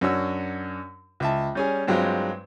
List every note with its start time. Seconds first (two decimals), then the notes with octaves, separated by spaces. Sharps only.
0.01 F#2 D4 F#4 C#5 E6
1.20 C#2 E5 A5
1.55 G3 C#4 G#4
1.87 G2 F#3 G#3 C4 F4